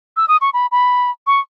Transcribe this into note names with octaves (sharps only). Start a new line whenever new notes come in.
E6
D#6
C#6
B5
B5
C#6